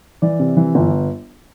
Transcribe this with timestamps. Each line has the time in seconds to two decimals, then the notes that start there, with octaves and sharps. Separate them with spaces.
0.22 E3 D5
0.39 C3
0.57 E3
0.75 G1